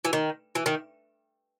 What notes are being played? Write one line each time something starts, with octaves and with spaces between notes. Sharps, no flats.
E3
D#3
E3
D#3